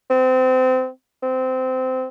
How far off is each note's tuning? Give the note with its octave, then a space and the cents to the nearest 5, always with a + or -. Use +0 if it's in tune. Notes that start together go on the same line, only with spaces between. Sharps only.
C4 -25
C4 -20